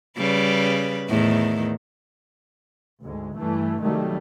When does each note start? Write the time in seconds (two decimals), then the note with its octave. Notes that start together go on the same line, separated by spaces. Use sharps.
0.18 C#3 G3 B4
1.09 E2 A2 D#3
3.03 D2 G#2 G#3
3.36 G2 E3 A3
3.82 C2 D#3 F#3 G3 A3